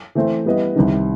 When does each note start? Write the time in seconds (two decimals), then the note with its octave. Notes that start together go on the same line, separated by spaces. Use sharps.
0.15 E3 A3 C4
0.45 G3 B3 E4 B4 D#5
0.76 C2 C3 D#3